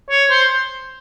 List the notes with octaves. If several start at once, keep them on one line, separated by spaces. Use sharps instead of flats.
C#5
C5